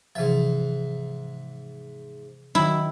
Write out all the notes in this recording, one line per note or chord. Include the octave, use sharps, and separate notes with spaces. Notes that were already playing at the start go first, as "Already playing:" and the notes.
G#2 C3 E3 F3 E5
D#3 F#3 E4